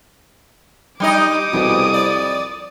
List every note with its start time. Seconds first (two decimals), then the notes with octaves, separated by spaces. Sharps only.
1.00 G3 D#4 D#5 D6 D#6
1.53 C2 F2 B2
1.94 D5